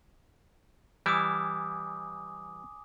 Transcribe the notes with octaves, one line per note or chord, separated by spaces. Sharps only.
E3 G3 E4 G#5 D6 D#6